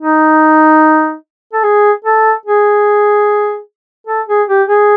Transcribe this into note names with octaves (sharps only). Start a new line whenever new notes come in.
D#4
A4
G#4
A4
G#4
A4
G#4
G4
G#4